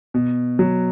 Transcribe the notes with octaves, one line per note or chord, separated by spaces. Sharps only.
B2
F#3